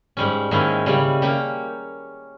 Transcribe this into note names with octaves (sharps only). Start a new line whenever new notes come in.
G#2 G3 C#4
G#2 D#3 A#3 C#4 E4
C#3 G3 C#4 G4
A#3 C#4 G4